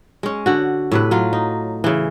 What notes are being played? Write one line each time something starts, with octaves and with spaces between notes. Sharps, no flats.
G#3 C#4
D3 F#4
A2 C3 B4
F#3 F4
D#4
C#3 E3